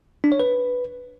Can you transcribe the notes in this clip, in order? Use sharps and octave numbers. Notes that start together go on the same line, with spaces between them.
D4
C#5
B4